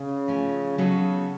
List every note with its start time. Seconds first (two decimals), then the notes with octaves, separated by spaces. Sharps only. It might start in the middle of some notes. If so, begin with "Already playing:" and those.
Already playing: C#3
0.28 F3 A3 C#4
0.78 C#3 F#3 B3 D#4 F#4 A4